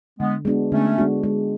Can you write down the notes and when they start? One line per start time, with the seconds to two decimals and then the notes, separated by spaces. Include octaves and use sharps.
0.19 D3 G#3 B3
0.45 G#3 B3 D4 F#4
0.72 D3 A3 C#4
0.98 G#3 B3 D4 F#4
1.23 G#3